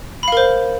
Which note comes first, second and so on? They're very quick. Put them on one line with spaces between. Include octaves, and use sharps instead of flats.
B5 F5 A#4 C5